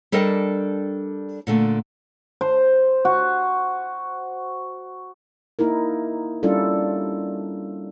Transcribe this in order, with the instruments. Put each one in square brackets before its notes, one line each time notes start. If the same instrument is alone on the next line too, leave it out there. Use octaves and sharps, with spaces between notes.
[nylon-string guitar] G3 D4 A4 A#4 D#5 G5
A#2 D3 A3
[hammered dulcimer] C5
F#4
[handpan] A#3 D#4 E4 A#4
G3 C#4 D4 E4 F4 A4